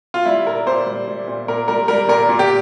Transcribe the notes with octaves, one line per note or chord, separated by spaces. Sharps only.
F4
G3 E4
A#2 A#4
A#2 C5
G3
G3
A#2
A#2 A#4
G3 A#4
G3 A#4
A#2 A#4
A#2
G4